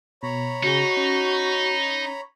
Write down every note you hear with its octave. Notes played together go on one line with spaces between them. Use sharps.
B2 C#5 A#5 B5
C#3 D#4 F#4 G#4
C#4